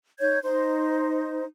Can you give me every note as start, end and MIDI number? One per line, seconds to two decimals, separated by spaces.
0.20 0.39 63
0.20 0.39 73
0.20 0.39 91
0.20 0.39 92
0.43 1.44 63
0.43 1.44 72